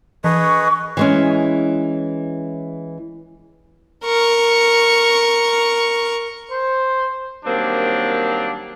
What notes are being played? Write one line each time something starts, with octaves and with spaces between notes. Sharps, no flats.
E3 G#4 B4 D#5 C#6
E3 G#3 C#4
A#4 C#6
C5
D#3 F#3 G3 A#3 C4 D4